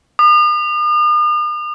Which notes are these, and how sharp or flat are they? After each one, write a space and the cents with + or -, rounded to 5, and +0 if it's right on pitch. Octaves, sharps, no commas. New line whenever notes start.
D#6 -45